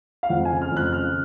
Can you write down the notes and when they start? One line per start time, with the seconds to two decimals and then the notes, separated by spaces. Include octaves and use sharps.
0.23 F5
0.30 F2 F#5
0.45 G#5
0.51 C#3
0.62 F6
0.72 F2
0.77 F#6
0.92 C#3 F6